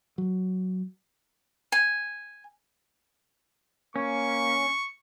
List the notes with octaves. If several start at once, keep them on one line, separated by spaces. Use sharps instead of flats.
F#3
G#5
A#3 C#4 C#6